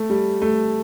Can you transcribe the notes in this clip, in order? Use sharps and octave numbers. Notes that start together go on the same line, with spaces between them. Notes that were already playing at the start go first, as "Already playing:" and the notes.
Already playing: A3
G3
A3